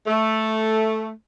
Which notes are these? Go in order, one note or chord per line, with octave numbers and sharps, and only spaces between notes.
A3